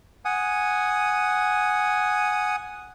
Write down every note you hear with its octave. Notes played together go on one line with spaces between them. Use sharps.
F#5 G#5 D#6